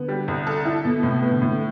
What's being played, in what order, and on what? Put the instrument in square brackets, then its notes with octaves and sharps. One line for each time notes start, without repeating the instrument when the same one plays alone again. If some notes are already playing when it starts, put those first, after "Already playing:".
Already playing: [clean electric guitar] D3 [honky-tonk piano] B3
[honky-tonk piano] G3
C2
A4
E4
B2
[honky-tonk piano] A2 [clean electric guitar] C3
[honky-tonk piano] B3
[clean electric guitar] D3
[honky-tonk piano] A2